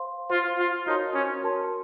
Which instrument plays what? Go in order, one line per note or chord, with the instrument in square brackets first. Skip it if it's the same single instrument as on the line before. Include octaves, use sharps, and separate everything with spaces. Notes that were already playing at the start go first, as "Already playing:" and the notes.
Already playing: [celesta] C5 F5 C6
[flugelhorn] F4 [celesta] C5 F5 C6
[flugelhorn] F4
[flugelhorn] D#4 [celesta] F#4 A#4 C#5 A5 C6
[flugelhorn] C#4
[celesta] F#4 A#4 C#5 A5 C6